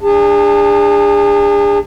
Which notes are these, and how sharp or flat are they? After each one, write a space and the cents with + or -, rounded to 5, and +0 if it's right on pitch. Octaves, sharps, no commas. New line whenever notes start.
D4 +0 G#4 -35 A5 +25